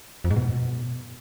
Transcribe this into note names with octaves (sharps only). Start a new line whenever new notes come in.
F2
G#2
B2